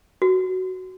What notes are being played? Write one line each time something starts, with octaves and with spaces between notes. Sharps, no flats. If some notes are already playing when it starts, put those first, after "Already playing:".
F#4